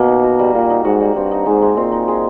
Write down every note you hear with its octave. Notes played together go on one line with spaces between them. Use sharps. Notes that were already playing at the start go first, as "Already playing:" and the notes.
Already playing: B2 A#3
D#4
F#4
G3
A#2 A#3
D#4
G#2 F#4
G3
G2 C4
D#4
G#2 G#3
G#3
A#2 C4
D#4
G#3